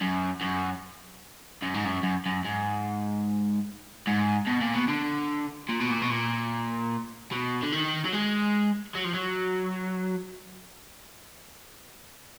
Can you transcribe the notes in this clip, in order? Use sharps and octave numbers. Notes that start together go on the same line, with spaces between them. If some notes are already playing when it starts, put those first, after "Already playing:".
F#2
F#2
F#2
G#2
F#2
F#2
F#2
G#2
G#2
B2
A#2
B2
D3
A#2
B2
A#2
B2
A#2
B2
D3
D#3
F#3
G#3
F#3
F3
F#3